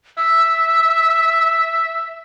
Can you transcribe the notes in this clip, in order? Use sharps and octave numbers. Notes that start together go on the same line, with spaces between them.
E5 E6